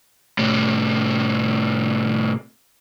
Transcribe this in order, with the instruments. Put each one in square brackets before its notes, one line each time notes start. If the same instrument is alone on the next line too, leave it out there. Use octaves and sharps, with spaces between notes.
[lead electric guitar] A2 C3